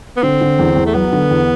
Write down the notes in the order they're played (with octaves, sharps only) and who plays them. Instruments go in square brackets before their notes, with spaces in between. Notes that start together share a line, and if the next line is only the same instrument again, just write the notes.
[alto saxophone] B3
[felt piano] D3 [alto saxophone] C4
[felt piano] D3
E2
E2
[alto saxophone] A3
[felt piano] F#3 [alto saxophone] B3
[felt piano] D3
E2